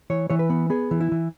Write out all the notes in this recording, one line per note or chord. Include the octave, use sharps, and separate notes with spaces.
E3 C#5
E3 C#5
B4
B3
B3 G#4
E3
E4
E3